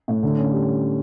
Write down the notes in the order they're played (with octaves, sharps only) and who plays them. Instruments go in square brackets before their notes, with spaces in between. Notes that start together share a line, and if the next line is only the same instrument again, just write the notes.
[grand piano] A2
D3
C#4
G3